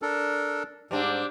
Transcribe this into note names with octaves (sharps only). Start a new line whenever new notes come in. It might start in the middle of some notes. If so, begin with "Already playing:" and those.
D4 A4 A#4
G#2 G3 C4 D4